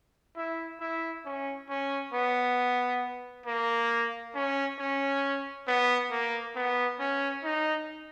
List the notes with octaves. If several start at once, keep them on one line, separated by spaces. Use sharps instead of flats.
E4
E4
C#4
C#4
B3
A#3
C#4
C#4
B3
A#3
B3
C#4
D#4